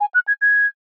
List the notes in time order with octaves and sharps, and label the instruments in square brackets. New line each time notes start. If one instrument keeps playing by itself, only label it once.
[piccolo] G#5
F#6
G#6
G#6